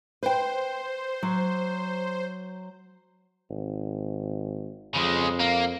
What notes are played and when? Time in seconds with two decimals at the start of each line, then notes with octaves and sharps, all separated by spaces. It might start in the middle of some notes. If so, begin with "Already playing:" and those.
0.23 B4 C5 G5
1.23 F#3
3.50 G#1
4.96 F2 C#3 G#3
5.40 A#3